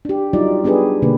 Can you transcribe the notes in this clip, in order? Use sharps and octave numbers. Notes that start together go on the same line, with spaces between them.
D4 G4
F#3 G3 D#4 F4 D5
B3 D4 G4 G#4 B4
B2 D3 A#3 D4 B4